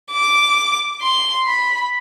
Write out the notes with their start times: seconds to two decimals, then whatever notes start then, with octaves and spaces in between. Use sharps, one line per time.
0.12 D6
1.02 C6
1.47 B5